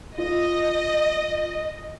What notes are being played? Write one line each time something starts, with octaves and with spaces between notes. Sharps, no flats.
F4 D#5